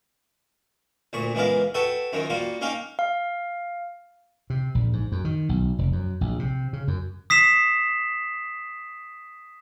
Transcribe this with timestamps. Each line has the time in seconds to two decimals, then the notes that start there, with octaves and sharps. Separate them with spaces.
1.13 D2 A#2 C#6
1.35 C#2 E3 G#3 B3 A#4 F5
1.74 F#4 A4 B4 E5 G5
2.13 F#2 D#3 F3 D#4
2.30 G3 A#3 F4 F#4
2.61 A#3 C#4 D#4 F5 G5
2.99 F5
4.50 C3
4.75 A#1
4.93 G#2
5.12 F#2
5.25 D#3
5.49 B1
5.79 F1
5.93 F#2
6.21 A#1
6.39 C3
6.73 C#3
6.88 F#2
7.30 D#6 B6 C7 E7